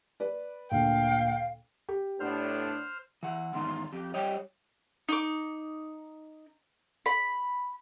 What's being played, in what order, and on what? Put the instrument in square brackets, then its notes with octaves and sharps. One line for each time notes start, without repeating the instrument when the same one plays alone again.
[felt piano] B4 D5
[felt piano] D2 A#2 [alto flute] F5 [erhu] G5
[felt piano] G4
[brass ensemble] A2 B3 D4 [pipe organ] C5 F6
[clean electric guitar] E3 F#5
[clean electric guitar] E2 G#2 D#3 [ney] C6
[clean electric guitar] F2 [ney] G4
[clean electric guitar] G3 C#5 D#5 [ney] G5
[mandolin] D#4 D6
B5